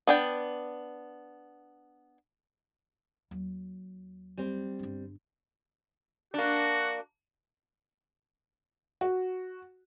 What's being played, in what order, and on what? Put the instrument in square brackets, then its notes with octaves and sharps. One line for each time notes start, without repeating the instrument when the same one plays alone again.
[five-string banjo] B3 D4 G5
[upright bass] D#2 F#3
[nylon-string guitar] G3 C4
[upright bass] G1 D4
[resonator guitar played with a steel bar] A#3 D4 [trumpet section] F#4
[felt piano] F#4